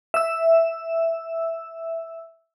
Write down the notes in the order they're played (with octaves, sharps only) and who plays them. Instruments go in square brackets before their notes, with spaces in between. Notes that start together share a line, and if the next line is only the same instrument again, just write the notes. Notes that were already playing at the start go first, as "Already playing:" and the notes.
[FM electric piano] E5 E6